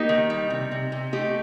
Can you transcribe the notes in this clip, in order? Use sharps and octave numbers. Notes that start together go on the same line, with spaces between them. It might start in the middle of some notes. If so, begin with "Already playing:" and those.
Already playing: A#3 D#4 G4
D#3
G3
C3
C3
C3
A3 D#4 G4